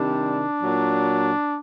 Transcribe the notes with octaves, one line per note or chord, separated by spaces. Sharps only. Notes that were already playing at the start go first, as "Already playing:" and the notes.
Already playing: C3 D#3 G3 D4
A#2 F#3